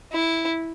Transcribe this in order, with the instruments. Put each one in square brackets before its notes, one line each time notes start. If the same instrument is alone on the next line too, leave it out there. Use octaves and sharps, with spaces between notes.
[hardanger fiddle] E4